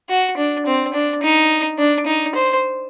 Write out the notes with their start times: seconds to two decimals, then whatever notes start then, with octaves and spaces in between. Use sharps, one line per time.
0.09 F#4
0.37 D4
0.66 C4
0.94 D4
1.23 D#4
1.78 D4
2.07 D#4
2.35 C5